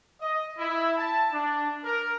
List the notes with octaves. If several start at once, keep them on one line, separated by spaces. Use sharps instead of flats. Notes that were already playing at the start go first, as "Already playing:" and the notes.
D#5
E4
A5
D4
A#4